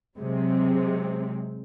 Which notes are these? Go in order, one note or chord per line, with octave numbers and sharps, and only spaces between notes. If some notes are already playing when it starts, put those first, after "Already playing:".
C3 F#3 G#3 C4